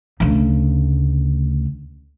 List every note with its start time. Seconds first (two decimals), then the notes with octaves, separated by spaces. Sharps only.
0.20 D2 C#3